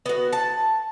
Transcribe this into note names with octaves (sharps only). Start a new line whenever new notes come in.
B3 F#4
A5